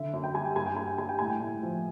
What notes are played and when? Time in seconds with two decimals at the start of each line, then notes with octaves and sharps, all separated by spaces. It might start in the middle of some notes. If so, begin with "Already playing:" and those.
Already playing: D3 E5
0.13 F#2
0.24 G5
0.34 G3 G#5
0.45 G5
0.56 G2 G#5
0.66 G5
0.77 G2 G#5
0.87 G5
0.98 G3 G#5
1.09 G5
1.19 A2 G#5
1.30 G5
1.41 A2
1.63 F3